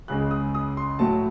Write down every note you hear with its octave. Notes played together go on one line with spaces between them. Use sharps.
C#2 C#3 G#3 F#6
D#6
D#6
C6
A2 F#3 A3 A5